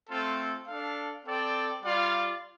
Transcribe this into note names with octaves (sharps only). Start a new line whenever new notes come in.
A3 C4 F4 A4
D4 A4 F5
C4 A4 D5 G5
G3 F4 D5 F5